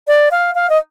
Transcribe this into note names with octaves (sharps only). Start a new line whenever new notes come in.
D5
F5
F5
D#5